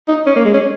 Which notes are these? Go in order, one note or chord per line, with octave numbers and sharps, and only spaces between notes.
D#4
C#4
A#3
G#3
C#4